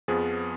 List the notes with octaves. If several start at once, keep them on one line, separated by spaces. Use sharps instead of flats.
F2 F3 B3 G#4